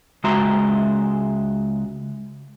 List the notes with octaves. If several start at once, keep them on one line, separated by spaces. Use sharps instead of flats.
C#2 G#3 F#4 E5 A#5 C6